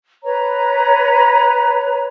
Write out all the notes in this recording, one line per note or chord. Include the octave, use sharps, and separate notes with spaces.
B4 C#5 A#5